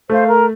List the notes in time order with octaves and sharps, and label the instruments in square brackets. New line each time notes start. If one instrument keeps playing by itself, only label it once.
[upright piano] A3 [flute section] C5 F5
[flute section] A#4